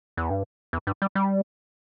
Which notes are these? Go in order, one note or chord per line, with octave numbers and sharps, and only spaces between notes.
E2
G2
E2
G2
G3
G3